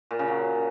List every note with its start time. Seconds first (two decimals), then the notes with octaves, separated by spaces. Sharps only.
0.11 A#2
0.19 C#3
0.28 F#3